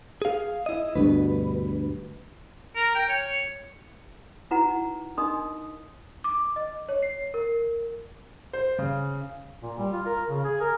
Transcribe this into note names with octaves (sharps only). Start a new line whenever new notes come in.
G#4 F5
E4 D#5
D2 G2 B2 B4
A#4
G5
C#5
D#4 E4 F#4 B4 F#5 A#5
D4 D#4 A#4 D#5 C6 D#6
D6
D#5
C#5
C7
A#4
C5
C#3
A#2
G3
F4
A#4
C#3
G#4
A#4